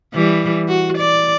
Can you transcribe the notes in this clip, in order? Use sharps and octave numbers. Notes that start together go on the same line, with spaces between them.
E3 G3
F#4
D5